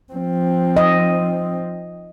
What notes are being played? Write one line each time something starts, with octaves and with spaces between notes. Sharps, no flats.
F3 C4
D#5